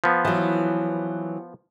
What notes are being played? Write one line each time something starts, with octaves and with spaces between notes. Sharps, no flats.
F3 B3
E3 F#3